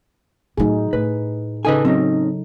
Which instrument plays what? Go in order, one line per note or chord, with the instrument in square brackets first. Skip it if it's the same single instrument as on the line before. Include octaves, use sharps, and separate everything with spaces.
[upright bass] A2 F#3 [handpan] D#4 G#4
[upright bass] A2 [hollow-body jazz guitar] B4
[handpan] C#3 D#4 A4 [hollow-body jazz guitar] B4 D#5 G#5
[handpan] F#3 [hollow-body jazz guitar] C4 C#4 D#4